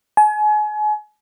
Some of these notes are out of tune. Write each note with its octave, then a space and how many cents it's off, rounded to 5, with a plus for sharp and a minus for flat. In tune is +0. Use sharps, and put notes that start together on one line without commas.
G#5 +35